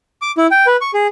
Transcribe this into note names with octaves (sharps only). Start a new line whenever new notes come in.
D6
E4
G5
B4
C#6
G#4